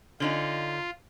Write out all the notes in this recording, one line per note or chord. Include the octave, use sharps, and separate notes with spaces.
D3 C#4 D#4 F4